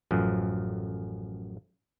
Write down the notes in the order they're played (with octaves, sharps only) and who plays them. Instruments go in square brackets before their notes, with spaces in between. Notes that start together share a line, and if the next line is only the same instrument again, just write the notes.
[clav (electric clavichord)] A1 F#2 F3